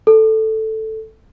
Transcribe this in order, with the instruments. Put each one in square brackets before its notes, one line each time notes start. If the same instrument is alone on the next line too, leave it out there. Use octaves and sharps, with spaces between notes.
[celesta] A4